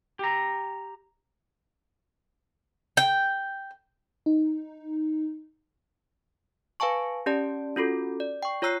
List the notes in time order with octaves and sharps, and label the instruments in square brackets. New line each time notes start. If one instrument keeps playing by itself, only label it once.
[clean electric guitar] G4 A#5
[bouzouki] G5
[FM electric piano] D#4
[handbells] B4 F5 G#5 A5 C#6
C#4 G4 D5 A5
C#4 F4 F#4 A4
D5
G5 C#6
F4 C#5 A#5 E6 F#6 C7